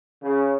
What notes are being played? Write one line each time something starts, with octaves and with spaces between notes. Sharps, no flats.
C#3